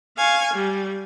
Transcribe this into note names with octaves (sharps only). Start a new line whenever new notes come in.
F5 G#5 C#6
G3